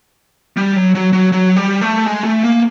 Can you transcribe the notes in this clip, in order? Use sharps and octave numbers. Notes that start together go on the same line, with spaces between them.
G3
F#3
F#3
F#3
F#3
G3
A3
G#3
A3
A#3